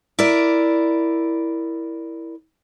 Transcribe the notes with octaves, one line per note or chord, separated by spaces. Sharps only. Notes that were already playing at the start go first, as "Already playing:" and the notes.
E4 A#4 D5